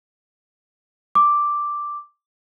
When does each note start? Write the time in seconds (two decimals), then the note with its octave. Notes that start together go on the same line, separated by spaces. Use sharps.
1.15 D6